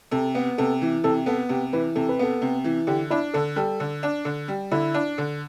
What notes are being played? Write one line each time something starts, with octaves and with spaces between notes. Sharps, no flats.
C3 A4
B3
C3 A4
E3
C3 A4
B3 A4
C3 G4
E3 B4
C3 A4
B4
B3 A4
C3
E3
D3 G4
D4 E4
D3 A4
G3 A4
D3
D4
D3
G3
D3 E4
D4
D3